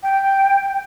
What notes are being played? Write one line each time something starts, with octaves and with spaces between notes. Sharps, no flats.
G5